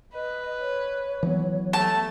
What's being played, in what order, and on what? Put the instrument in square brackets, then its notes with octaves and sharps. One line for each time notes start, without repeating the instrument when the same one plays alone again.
[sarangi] B4 [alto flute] D#5
[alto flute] C#5
[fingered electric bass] E3 F#3 B3
[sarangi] A3 [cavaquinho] A5